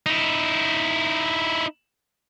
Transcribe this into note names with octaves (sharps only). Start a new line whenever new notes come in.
D#4 E4